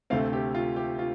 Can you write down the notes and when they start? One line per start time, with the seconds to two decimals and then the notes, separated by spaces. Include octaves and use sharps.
0.10 D2 C3 A3 C4 F5
0.33 G4
0.55 F4
0.76 G4
0.99 F4